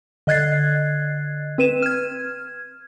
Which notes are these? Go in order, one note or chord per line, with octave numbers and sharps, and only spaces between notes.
D3 D#5 F#6 G#6 A6 C7
C4 B4 D#7 E7
F6 G#6